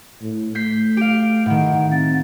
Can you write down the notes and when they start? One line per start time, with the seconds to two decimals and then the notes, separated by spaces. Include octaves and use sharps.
0.22 A2
0.55 A3 G6 B6 C7
0.97 G4 F5 D7
1.46 A2 D#3 F#5
1.91 C4 A6